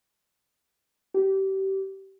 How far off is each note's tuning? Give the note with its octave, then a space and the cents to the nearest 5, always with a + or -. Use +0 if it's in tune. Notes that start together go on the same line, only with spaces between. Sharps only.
G4 -25